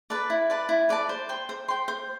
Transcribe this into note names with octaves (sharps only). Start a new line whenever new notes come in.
B4 D5 A5
E4
B4 D5 A5
E4
B4 D5 A5
C5
G5 C6
C5
G5 C6
C5